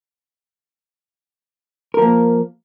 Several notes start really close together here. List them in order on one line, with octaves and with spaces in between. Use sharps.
A#4 F3 A#3